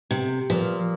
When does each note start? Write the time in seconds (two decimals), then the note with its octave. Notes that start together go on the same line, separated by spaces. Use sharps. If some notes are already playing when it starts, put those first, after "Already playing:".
0.11 C3
0.50 A#2 F3